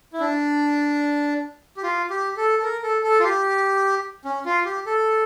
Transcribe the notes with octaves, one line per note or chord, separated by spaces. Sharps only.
E4
D4
G4
F4
G4
A4
A4
A#4
A4
A4
F4
G4
C#4
F4
G4
A4